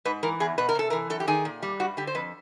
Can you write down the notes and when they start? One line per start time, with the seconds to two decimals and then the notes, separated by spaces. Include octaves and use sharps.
0.05 G#2 B4
0.23 E3 A#4
0.40 E2 G#4
0.58 B2 B4
0.69 A#4
0.75 C3 A4
0.90 E3 A#4
1.10 F#2 A4
1.20 G4
1.27 D#3 G#4
1.45 A#2
1.62 G3
1.80 G2 F#4
1.97 D3 G4
2.07 C5
2.15 F2 B4